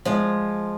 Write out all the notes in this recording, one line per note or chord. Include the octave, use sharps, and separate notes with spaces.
F3 G#3